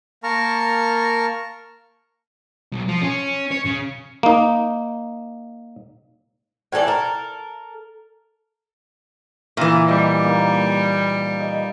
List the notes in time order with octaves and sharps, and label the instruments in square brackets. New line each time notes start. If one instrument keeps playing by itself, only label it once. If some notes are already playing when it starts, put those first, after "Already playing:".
[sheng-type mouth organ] A#3 A#4 A5 A#5 C#6 F6
[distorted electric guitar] B1
F3
C#4
C#5
C#3
[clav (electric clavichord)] A#3 D#4
[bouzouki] A2 E3 A4 D5
A4 A#4
[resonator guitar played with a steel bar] A#2 E3 [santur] A#4
[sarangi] G3 [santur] D#5 D6
[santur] A#3 D#4
D#5